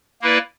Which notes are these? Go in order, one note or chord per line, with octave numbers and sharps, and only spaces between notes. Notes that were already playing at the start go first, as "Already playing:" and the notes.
A#3 E4 B4 D5